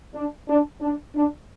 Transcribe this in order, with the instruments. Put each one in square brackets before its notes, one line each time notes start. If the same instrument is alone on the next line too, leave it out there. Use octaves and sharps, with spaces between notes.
[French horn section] D4
D4
D4
D4